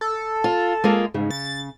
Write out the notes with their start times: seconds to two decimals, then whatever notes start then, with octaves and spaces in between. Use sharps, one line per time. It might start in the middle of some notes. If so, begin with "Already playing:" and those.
0.01 A4
0.44 F4
0.84 G#3 A#3 F4
1.14 G#2 C#3
1.31 A6